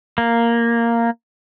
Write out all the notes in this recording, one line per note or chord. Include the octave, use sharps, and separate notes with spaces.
A#3